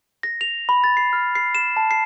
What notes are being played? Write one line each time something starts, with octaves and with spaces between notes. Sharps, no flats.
A#6
F7
B5
A6
C7
F6
C7
E7
A5
C7